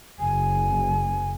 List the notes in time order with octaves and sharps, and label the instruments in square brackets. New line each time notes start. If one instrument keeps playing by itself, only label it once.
[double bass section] F#1 [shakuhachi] G#5